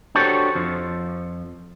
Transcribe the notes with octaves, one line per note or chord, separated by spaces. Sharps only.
D4 F#4 G4 A4 C5 C#5
F2 F3